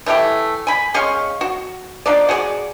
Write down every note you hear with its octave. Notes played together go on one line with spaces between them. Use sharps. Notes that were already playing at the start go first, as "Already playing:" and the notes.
E3 A3 E4 G4
G#5 B5
G#3 C#4 F5 C#6
F#4
F3 D4 D#4 D5
F#4 G#4 C#5 D5